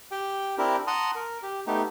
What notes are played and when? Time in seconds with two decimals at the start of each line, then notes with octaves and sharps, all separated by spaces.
0.11 G4 G5
0.58 C4 D4 E4 G4 A#4
0.87 F#5 A5 A#5 C6 D#6
1.15 A#4
1.43 G4
1.67 A3 B3 D#4 G4